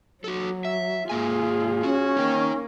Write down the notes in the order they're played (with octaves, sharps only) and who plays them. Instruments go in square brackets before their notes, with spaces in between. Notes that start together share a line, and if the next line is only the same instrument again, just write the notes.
[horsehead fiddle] F#3 [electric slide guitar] F#4 A4
[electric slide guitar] E5
[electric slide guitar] G#2 A#3 G#5 [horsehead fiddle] F4 G#4
[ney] C#4 [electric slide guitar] F#4
[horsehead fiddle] A#3 [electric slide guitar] D#4 G5